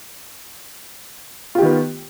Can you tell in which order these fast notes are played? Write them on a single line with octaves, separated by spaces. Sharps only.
F4 G4 D#3 B3